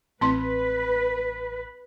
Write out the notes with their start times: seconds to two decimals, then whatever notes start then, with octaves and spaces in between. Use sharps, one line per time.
0.21 A1 C4 B4 C6